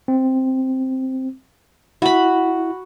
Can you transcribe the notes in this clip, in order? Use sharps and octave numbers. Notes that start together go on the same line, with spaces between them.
C4
E4 F#4 B5